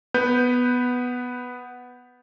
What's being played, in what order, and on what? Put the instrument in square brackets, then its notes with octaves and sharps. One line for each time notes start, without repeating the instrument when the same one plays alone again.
[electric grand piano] B3 B4 G6